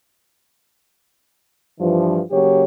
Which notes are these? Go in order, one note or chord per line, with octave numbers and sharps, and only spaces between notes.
G2 E3 F3
C#3 F#3 A#3 G4 C#5